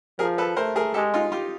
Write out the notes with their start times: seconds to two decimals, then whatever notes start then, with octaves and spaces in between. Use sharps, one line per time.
0.19 F3 G#4 A#4
0.38 A4 B4
0.56 A3 A#4 C5
0.76 G#4 A#4
0.94 G#3 G4 A4
1.14 D#4 F4
1.32 F4 G4